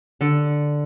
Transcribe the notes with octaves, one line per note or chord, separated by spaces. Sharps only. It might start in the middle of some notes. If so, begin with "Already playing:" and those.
D3